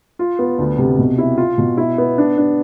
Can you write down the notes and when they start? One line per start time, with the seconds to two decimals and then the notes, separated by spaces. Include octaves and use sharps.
0.19 F4
0.39 B3
0.58 D2
0.78 C3
0.98 B2
1.18 E4
1.38 F4
1.58 B2
1.77 E4
1.98 B3
2.18 D4
2.38 D4